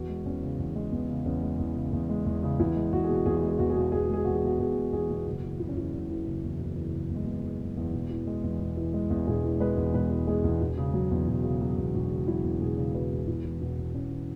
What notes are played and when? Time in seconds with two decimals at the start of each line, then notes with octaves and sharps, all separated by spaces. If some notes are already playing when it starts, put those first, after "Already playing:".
Already playing: E2 F#4
0.09 G#3
0.26 E2 C#4
0.42 C#3
0.59 E2 B3
0.75 G#3
0.92 E2 B3
1.09 C#3
1.26 E2 C#4
1.43 G#3
1.59 E2
1.76 C#3
1.93 E2
2.09 G#3
2.26 E2
2.43 C#3
2.59 E2 E4
2.76 G#3
2.93 E2 F#4
3.04 G#4
3.09 B2
3.15 F#4
3.26 E2 G#4
3.36 F#4
3.43 G#3
3.48 G#4
3.59 E2 F#4
3.70 G#4
3.76 B2 F#4
3.92 E2 G#4
4.02 F#4
4.10 G#3 G#4
4.24 E2 F#4
4.35 G#4
4.43 B2 F#4
4.59 E2 G#4
4.76 G#3
4.93 E2 G#4
5.10 B2
5.26 F#1 F#4
5.43 E3
5.60 F#1 E4
5.69 C#4
5.77 E2 E4
5.93 F#1 C#4
6.09 E3
6.26 F#1
6.43 E2
6.60 F#1
6.76 E3
6.94 F#1
7.10 E2
7.16 G#3
7.27 F#1 B3
7.43 E3
7.60 F#1
7.77 E2
7.93 E1
8.10 E3
8.27 G#3
8.44 E2
8.60 E1
8.77 E3
8.94 G#3
9.10 E2
9.27 E1 G#4
9.44 E3
9.60 G#3 B4
9.77 E2
9.94 E1 B4
10.11 E3
10.27 G#3 G#4
10.44 E2
10.61 E1
10.78 C#3
10.94 F#3
11.11 E2
11.27 E1
11.44 C#3
11.61 F#3
11.77 E2
11.94 E1 F#4
12.11 C#3
12.27 F#3 E4
12.44 E2
12.61 E1 G#4
12.78 C#3
12.94 F#3 B4
13.11 E2
13.28 E1 E4
13.44 E3
13.61 E1 B3
13.78 E2
13.94 E1 C#4
14.11 E3